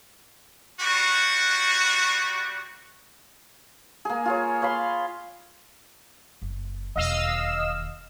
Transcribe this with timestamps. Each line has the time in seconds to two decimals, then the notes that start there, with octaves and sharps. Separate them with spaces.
0.81 G3 F#4
4.05 A#3 G#4
4.25 F4 G#4 C#5
4.62 C#5 F5 B5 C6
6.42 F#1
6.96 E1 D#2 D#5 F5 E6